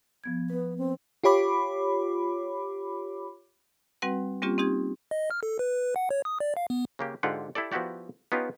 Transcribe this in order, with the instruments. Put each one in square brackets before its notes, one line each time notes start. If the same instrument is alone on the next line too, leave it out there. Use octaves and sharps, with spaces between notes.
[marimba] F3 B3 G#6
[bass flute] B3 [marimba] B4
[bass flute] C4
[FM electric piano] F4 G4 C#5 B5 D6
[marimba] G3 C4 F#4 B4 F#5
G3 A#3 C4 C#4 F4 G4
C4 D#4 G4 G#6
[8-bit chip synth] D#5
F6
A4
B4
B4
F#5
C#5
D#6
D5
F5
B3
[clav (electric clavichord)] C#3 A#3 G4
G#2 D3 F4 G4 F#5
E4 G4 A4 D5
F3 B3 E4 F#4 G4 D5
B3 C#4 D#4 F4 G4 B4